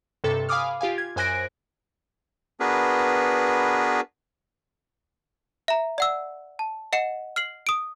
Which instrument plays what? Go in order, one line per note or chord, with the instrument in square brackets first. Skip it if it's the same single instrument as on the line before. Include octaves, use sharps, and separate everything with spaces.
[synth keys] G2 C3 A4 C#6 A6
F5 G#5 B5 D6 D#6 F6
F4 G4 F5 G#5
G#6
F#2 C5 G#5 F#6 A#6 D7
[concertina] B3 D4 F#4 G#4 A#4 B4
[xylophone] E5 A#5
D5 F#5 E6
A5
D#5 F#5 C#7 E7
F6 C7 F#7
D#6 D7